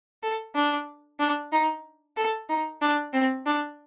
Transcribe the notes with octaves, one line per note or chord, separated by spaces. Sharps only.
A4
D4
D4
D#4
A4
D#4
D4
C4
D4